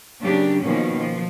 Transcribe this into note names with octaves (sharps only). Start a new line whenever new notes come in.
C#3 F#3 A#3 D4 G4
B2 D#3 F3 A#3 C#4
F3